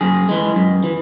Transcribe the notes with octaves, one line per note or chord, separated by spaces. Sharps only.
F#2 G#4
E3 G#3
F#2
E3